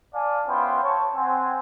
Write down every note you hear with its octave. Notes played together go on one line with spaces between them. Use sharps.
D5 F5 G#5 A5
B3 C#4 E4 F4 C5 G5
C#5 A5 C#6
C4 F#5 G#5